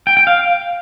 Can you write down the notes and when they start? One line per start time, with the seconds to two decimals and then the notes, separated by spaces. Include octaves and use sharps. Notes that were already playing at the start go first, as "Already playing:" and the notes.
0.07 G5
0.17 G5
0.27 F5